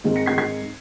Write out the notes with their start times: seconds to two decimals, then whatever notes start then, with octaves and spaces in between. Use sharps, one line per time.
0.04 G#2 D#3 G#3 C4 D#4
0.16 A#6 C#7
0.26 G#6 C7
0.38 G#6 C7